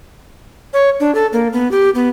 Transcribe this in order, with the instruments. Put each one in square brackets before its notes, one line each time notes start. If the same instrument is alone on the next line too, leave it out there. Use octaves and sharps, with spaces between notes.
[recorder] C#5
D4
A4
A#3
B3
G4
B3